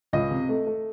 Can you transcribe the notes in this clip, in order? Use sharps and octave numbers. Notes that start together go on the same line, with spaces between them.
C#2 D#5
C3
A3
A3